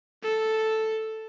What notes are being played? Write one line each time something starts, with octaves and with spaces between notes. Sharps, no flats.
A4